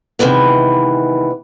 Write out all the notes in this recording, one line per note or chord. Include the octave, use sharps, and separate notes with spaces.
C3 D#3 E3 G#3 B3